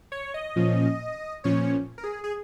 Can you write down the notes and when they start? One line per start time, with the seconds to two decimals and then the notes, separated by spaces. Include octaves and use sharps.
0.12 C#5
0.34 D#5
0.56 A#2 F3 C#4
1.44 A#2 F3 C#4 C#5
1.98 A#4
2.04 G#4
2.24 G#4